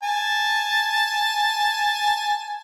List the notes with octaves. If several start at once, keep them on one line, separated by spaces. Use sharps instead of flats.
G#5 A5